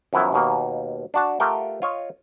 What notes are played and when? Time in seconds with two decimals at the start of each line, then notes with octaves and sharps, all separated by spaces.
0.13 F#2 D#3 F3 B3 E4
0.33 D#2 B2 A#3
1.14 D4 F#4 A5
1.40 A3 F4 G4 A#4 F#5 G5
1.82 F4 C#5 D#5